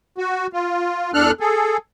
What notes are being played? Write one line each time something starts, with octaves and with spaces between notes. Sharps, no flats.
F#4
F4
E2 D4 A4 F6 F#6
G#4 A4